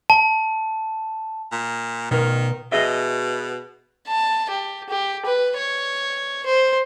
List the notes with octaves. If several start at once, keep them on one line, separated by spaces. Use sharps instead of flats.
A5
A#2
B2 D#3 A#4
B2 G#4 D#5 E5
A5
G4
G4
B4
C#5
C5